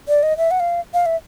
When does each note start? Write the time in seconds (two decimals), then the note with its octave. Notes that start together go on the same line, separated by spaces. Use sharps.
0.08 D5
0.23 D#5
0.38 E5
0.51 F#5
0.60 F5
0.94 F5
1.06 E5